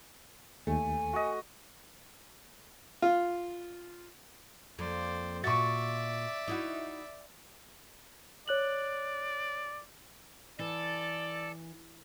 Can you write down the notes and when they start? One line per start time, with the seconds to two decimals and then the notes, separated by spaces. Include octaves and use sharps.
0.67 D#2 A3 G#5
1.13 F#4 D#5
3.02 F4
4.79 F2 A#3 C5 D5
5.44 A#2 F#4 D5 E5 C#6 A6
6.48 D#4 E4 F#4
8.48 C#5 D5 F#6 F#7
10.59 E3 A4 D5